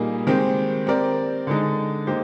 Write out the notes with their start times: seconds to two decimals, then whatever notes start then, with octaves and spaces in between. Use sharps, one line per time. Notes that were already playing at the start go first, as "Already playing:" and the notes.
Already playing: A#2 G3 A#3 D#4 G#4
0.27 D#3 G#3 C4 G4
0.87 C4 G4 A#4 D5
1.47 D3 G#3 D#4
2.07 A#3 D#4 G4 C5